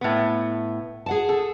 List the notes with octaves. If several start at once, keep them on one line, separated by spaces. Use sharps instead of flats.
A2 B3
G#4 F#5 A5
A4